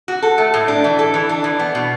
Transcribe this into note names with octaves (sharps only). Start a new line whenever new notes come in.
F#4
A4
A3
A2
D4
E3
A4
E3
D4
E3
B3
B2